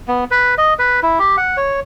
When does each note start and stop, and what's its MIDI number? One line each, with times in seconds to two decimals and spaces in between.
0.08 0.24 59
0.31 0.55 71
0.58 0.74 75
0.79 1.00 71
1.03 1.19 64
1.19 1.36 67
1.37 1.57 78
1.57 1.80 73